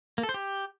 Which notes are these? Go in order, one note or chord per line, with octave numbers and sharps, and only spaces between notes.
A#3
A4
C5
G4